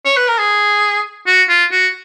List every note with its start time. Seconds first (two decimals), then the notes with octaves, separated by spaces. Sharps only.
0.05 C#5
0.17 B4
0.28 A#4
0.38 G#4
1.27 F#4
1.49 F4
1.72 F#4